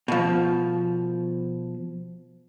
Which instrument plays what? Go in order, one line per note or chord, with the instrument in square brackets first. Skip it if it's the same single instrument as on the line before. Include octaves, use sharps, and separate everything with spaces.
[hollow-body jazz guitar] B2 F3